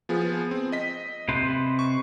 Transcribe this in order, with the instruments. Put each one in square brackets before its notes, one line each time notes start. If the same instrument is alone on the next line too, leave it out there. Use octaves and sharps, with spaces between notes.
[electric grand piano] F3 B3 G#4
C4
D#5 B6
[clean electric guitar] C3 B4 C5
[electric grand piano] C#6